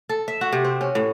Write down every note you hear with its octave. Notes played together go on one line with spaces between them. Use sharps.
A4
E5
F#4
C3
C4
C#4
A2